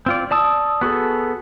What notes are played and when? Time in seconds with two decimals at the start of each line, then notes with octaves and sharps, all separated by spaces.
0.06 C4 F4 D5
0.31 D5 A5 D#6 E6
0.81 B3 F#4 G#4 A4